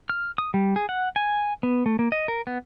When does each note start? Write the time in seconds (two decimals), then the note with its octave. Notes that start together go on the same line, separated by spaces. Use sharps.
0.10 F6
0.38 D#6
0.54 G3
0.76 G#4
0.89 F#5
1.16 G#5
1.63 B3
1.86 A3
1.99 A#3
2.12 D#5
2.28 A#4
2.47 B3